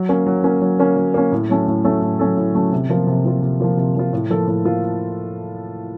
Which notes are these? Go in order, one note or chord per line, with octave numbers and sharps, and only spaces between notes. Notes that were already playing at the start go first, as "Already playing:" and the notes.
Already playing: F#3
A#3 C#4
F#3
A#3 C#4
F#3
A#3 C#4
F#3
A#3 C#4
A2
F#3 A3 C#4 A4
A2
F#3 A3 C#4 A4
A2
F#3 A3 C#4 A4
A2
F#3 A3 C#4 A4
C3
F3 A#3 F4
C3
F3 A#3 F4
C3
F3 A#3 F4
C3
F3 A#3 F4
A2
F3 A#3 F4 A4
A2
F3 A#3 F4